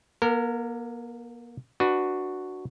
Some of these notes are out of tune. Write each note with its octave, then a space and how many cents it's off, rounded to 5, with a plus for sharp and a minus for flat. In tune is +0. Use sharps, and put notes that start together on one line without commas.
A#3 +40 A#4 -25
D4 +15 F#4 +0 B4 +0